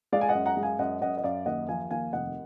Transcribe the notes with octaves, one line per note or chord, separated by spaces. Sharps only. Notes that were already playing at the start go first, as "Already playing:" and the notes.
G#3 D5 F5
G#5
D#5 F#5
F#2
F#5 A#5
G#3
F5 G#5
F#2 D#5 F#5
F#2 D#5 F#5
D#5
F#2 D5 F5
D#2 D#5 F#5
F3 F5 G#5
D#2 F5 G#5
F1 D#5 F#5